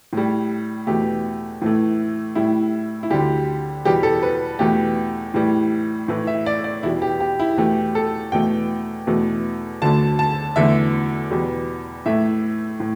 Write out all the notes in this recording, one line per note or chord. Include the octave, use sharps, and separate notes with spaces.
A2 G3
E2 B2 A3 G4
A2 E3 A3
A2 G3 E4
E4
D2 D3 G3 G4
E2 B2 G3 G4
A4
B4
E2 B2 A3 G4
A2 E3 G3
A2 E3 A3
E5
D5
D5
E2 B2 G3 E4
G4
G4
E4
E2 B2 A3 G4
A4
E2 B2 A3 G5
E2 B2 A3
D2 D3 A3 A5
A5
E2 D3 A3 E5
E2 B2 G3
A2 A3 E5
A2